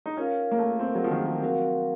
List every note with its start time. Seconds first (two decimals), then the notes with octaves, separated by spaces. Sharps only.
0.06 D#4
0.17 C#4 F4 A#4 F5
0.51 A#3
0.59 A3
0.79 C4
0.95 F#3
1.04 F3
1.11 D#3
1.27 F3
1.42 F#3 C4 F#4 A#4 F5